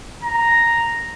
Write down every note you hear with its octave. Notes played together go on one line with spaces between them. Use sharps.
A#5